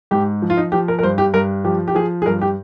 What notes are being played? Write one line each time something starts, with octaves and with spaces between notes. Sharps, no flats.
G#2 G4
F3
F4
D#4
F3 G4
A#4
A#4
G2 C5
G4
G2 A#4
F3 G4
G4
F3 G#4
G#4
G2 A#4
G4